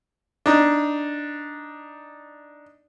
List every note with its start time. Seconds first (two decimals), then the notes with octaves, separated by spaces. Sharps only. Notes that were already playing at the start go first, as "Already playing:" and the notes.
0.46 D4 D#4